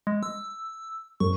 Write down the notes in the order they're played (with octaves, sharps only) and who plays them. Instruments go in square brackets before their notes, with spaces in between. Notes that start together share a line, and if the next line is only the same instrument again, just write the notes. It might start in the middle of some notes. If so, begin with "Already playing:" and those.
[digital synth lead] G#3
E6
[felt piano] F#2 [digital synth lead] C#6